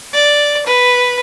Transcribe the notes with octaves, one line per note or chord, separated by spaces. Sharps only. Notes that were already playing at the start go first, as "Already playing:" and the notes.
D5
B4